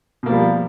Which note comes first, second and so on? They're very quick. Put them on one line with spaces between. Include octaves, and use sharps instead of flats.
B2 A#3 F3 G3